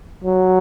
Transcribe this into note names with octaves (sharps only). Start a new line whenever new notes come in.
F#3